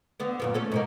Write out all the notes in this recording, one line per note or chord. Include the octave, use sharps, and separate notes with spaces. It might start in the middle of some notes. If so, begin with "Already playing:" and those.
D3 B3
F#2 A#2 B3
A3 C#4 A4
G#2 B2 A#3